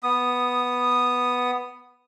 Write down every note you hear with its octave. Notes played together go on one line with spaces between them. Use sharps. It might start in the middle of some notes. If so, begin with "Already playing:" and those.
B3 D#6